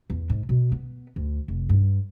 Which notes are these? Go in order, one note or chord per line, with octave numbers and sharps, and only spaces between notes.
E2
G#2
B2
B3
D2
F1
G2